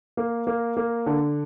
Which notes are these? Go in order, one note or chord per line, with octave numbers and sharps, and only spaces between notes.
A#3
A#3
A#3
D3